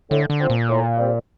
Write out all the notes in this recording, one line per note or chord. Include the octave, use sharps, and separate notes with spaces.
A2 D3
D3
F3 C4
A#2
A2
G3 C4